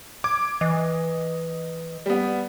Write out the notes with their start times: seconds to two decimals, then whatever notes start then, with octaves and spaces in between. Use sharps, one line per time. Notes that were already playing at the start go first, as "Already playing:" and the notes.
0.24 D6 G#6
0.61 E3 D#5
2.06 G3 B3